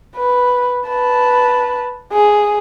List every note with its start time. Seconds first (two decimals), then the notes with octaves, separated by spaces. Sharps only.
0.16 B4
0.87 B4 A5
2.13 G#4